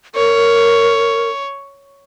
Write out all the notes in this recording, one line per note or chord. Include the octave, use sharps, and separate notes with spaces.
A#4 C#5